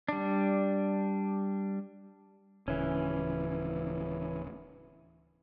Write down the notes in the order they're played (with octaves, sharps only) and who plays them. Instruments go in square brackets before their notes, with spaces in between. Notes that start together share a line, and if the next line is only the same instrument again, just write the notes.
[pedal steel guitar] G3 D4
[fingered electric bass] D1 C#3 [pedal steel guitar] E3 C#4